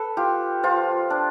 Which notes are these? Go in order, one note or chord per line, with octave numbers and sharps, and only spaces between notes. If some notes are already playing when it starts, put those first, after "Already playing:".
Already playing: A4 B4
F4 G4
F3 F4
D4